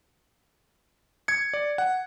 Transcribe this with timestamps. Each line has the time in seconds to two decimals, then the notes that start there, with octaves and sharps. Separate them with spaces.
1.28 G#6 C#7
1.53 D5
1.78 F#5